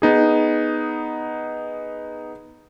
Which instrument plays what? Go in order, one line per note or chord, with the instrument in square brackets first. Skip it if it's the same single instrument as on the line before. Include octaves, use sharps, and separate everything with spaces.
[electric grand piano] B3 D#4 G#4